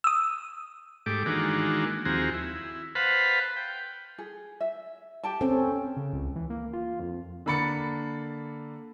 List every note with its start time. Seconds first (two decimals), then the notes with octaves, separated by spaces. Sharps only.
0.04 D#6 E6
1.06 G#2 A3 G4 D6
1.26 D#3 E3 G#3 A#3 D4 F#4
2.05 D#2 F3 C4 F#4 G#4 A#5
2.34 E4
2.95 B4 C5 F5 F#5 A5 B5
3.57 G5
4.18 G#4
4.61 E5
5.23 G4 G5 A5
5.41 C4 C#4 A4
5.97 C#3
6.13 C#2
6.36 E3
6.50 A#3
6.73 F4
7.00 F2
7.46 D3 A#3 B5 A6 C#7